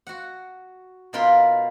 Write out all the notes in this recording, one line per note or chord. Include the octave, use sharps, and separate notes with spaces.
F#4 F#5
B2 D#4 F4 A#4 B5 C6